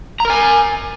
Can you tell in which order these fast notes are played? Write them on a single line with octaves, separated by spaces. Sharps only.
A#5 A#4 G#5